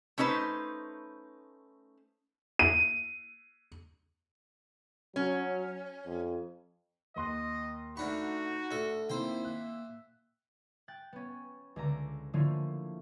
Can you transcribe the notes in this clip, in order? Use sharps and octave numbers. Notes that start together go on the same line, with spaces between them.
A3 C#4 D#4 B4 C5
D#7
F#3 C#4
F2
D#2 D#5 C6 F#6
D2 D4 D#4 F#4 B5 C#6
D2 A4
D#3 A#3 C4 E4 C5 E5 G5
F#6
G5 F#6 A6
B3 C#4
C#2 D3 A#5 D6
D3 F3 A3 A#3 C#4 E4